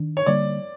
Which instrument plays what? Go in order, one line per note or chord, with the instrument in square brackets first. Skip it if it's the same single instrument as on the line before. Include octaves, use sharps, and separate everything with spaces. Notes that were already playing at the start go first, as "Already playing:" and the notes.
Already playing: [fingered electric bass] D#3 D4
[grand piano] C#5
[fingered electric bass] D3 G3 A#3 [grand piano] D5